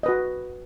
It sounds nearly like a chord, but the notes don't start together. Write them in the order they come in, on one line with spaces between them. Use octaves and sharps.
D#5 B4 F#4